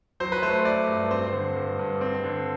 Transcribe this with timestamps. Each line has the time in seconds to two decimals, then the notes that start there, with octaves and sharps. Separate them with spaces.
0.20 F#3 C5
0.32 B4
0.42 A3 C5
0.65 A3 D5
0.88 G2
1.10 C4 C5
1.33 D3
1.56 G2
1.79 G2
2.01 C4
2.24 D3